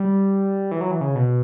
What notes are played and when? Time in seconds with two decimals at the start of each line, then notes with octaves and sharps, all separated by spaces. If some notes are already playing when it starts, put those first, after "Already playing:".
Already playing: G3
0.71 E3
0.81 F#3
0.91 E3
1.01 C#3
1.15 B2